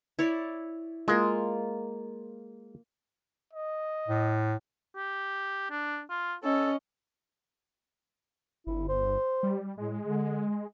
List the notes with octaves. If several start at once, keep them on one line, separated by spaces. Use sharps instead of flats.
E4 C#5 D5
G#3 A#3 F4
D#5
A2
G4
D4
F4
C#4 A4 D#5
G1 E4
C5
G3
A2 G#3
D3